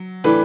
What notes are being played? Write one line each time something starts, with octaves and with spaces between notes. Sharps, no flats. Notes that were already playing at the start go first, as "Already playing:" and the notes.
Already playing: F#3
A2 E3 A3 D4 B4